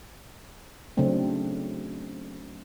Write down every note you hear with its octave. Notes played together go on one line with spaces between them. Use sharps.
C#3 F#3 A3 C4 D4